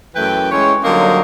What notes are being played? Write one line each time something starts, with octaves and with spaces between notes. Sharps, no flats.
F#2 E3 A3 B4 G5
G#3 C#4 E4 C#5
D3 F#3 G3 A#3 C4 D#4